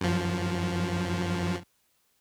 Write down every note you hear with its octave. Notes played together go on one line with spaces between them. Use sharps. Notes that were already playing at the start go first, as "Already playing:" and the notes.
F#2 F3